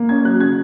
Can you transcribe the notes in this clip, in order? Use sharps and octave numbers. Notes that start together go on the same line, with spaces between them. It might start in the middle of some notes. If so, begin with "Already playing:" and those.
Already playing: A#3
C#4 G#6
F#3 F#6
C#3 G#6